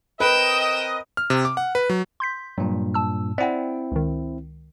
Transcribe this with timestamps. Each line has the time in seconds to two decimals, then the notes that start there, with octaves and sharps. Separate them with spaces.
0.20 C4 A#4 B4 D#5 G5 E7
1.17 F6
1.30 C3
1.45 D6
1.57 F#5
1.75 B4
1.89 F#3
2.20 C6 G6 B6
2.58 G2 A#2 F#3
2.94 A5 E6
3.38 C4 E4 D5 F#5 G5
3.92 C#2 D#3